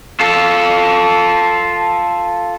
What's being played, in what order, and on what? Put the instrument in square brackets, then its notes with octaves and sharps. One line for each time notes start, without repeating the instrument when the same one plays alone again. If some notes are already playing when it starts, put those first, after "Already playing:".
[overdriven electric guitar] F4 A4